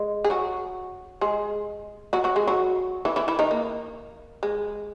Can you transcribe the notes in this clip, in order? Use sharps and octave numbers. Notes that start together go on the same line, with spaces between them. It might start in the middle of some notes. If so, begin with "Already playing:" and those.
Already playing: G#3
G#4
F#3 F#4
G#3 G#4
F#3 F#4
F#3 F#4
G#3 G#4
F#3 F#4
E3 E4
E3 E4
E3 E4
D#3 D#4
A#3
G#3